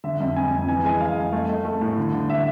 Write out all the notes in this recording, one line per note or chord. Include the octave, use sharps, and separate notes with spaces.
D3 E5
F2
F2 G#5
F2
E3 G#5
G#3 G#5
G#3 F5
F2
A3
A3
A3
A2
D3
D3
D3 E5